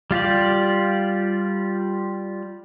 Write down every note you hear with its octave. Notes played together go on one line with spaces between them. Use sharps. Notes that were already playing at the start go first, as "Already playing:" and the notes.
G3 F4 G4 D5